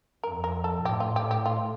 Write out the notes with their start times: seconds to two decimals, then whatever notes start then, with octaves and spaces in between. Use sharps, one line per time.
0.24 F2 A#4
0.44 A#4
0.64 A4
0.85 A2 G4
1.00 F4
1.16 G4
1.31 G4
1.46 F4